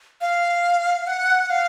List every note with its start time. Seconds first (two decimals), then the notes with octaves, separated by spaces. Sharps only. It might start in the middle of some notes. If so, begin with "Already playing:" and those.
0.21 F5
1.07 F#5
1.50 F5